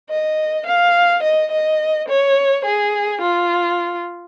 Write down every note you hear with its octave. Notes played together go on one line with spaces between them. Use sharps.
D#5
F5
D#5
D#5
C#5
G#4
F4